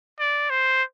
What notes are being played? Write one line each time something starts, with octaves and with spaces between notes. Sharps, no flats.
D5
C5